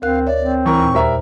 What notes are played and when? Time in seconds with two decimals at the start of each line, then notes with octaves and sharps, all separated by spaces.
0.02 D2 C4 A#4 F5 F#6
0.27 C#5 D5 E5
0.40 C4
0.66 E3 A#4 C#6
0.80 D#2 A#2
0.94 G3 A#4 C5 E5 A#5